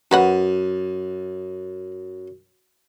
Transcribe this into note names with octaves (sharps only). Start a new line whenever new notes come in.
F#2 F#4 B4 F#5